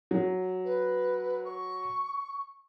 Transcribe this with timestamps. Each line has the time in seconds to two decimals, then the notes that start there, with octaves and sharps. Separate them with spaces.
0.11 F#3
0.65 B4
1.45 C#6